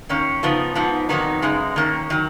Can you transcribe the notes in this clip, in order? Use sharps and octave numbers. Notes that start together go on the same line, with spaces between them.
D#3 A#3 C#4
C#3 F3 B3 D#4
G#2 F3 B3 D#4
F2 D#3 F#3 B3 D#4
F#2 C#3 G#3 D#4
D#3 A#3 C#4
D#3 F#3